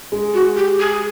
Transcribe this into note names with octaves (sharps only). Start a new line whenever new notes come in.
G#3
F#4
G4
G#4